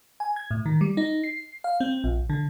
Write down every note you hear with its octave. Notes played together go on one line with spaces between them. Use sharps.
G#5
G#6
A2
D#3
G3
D#4
C7
F5
C4
A#1
D3